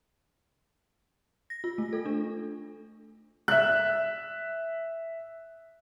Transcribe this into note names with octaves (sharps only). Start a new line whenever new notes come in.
A#6
F4
A3
A4
D4
E5 F#6